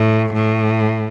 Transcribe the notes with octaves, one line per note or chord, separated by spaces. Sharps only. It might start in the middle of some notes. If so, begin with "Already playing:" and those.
Already playing: A2
A2